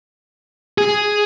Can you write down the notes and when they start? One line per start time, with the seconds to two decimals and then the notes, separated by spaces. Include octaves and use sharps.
0.78 G#4